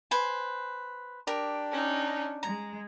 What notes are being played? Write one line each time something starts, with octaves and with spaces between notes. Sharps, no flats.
B4 C5 G#5
D4 G4 A#4
C#4 D#4
G#3 A#5